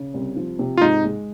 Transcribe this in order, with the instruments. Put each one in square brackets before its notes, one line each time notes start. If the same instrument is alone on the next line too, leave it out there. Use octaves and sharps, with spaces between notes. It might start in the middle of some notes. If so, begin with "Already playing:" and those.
Already playing: [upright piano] C#3
C2
F3
C3
[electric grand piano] F4
[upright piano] G#2 [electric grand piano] D#4
[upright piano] G#3